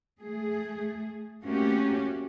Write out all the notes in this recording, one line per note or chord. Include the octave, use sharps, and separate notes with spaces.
A3 G#4
A3 A#3 C4 C#4 F#4 G4